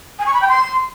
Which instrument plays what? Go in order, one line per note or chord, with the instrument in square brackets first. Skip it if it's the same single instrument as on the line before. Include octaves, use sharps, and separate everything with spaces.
[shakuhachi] G#5
C#6
B5
G5
C6